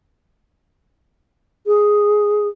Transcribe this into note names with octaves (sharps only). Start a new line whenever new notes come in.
G#4